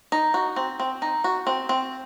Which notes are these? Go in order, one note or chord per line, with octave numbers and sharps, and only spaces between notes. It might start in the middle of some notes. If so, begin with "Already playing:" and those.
D#4
F#4
C4
C4
D#4
F#4
C4
C4